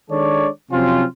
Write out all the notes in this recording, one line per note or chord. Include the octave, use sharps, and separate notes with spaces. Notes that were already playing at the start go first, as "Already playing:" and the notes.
D#3 G#3 D4 A4 C#5 D5
C3 F3 F#3 C4 C#4 F4